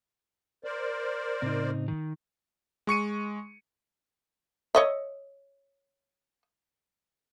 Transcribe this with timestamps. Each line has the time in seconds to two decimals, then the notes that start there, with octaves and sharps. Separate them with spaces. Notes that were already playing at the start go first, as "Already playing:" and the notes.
0.64 A#4 C5 D5
1.42 A2 C#3 C4 D#4
1.88 D#3
2.87 G#3 C#6 C#7 D#7
4.75 C#5 D#5 E5